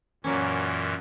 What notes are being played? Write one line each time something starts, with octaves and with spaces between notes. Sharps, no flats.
F#2 A#2 E3 F#3 A#3 C#4